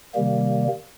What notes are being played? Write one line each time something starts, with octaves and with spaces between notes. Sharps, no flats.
C3 D#3 G3 A#3